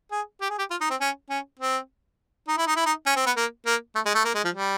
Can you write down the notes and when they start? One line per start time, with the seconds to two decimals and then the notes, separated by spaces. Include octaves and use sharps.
0.12 G#4
0.41 G4
0.50 G#4
0.59 G4
0.71 F4
0.81 D#4
0.90 C4
1.01 C#4
1.30 C#4
1.60 C4
2.48 D#4
2.57 E4
2.67 D#4
2.77 E4
2.86 D#4
3.06 C#4
3.16 C4
3.26 B3
3.37 A#3
3.66 A#3
3.95 A3
4.05 G#3
4.15 A3
4.25 A#3
4.35 G#3
4.45 F3
4.55 G3